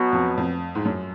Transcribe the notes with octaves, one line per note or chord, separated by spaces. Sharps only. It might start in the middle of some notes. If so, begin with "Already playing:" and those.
Already playing: B2 F#3 B3 F#4
F2
F2
G#2
F#2